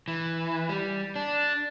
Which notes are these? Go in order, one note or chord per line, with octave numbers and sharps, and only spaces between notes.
E3
G3
D4